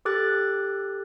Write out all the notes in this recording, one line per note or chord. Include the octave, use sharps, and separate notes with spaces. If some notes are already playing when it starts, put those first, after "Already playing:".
G4 A4 D6 F#6 A6